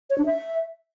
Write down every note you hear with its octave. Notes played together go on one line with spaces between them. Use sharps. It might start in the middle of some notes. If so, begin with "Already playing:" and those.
C#5
D4
E5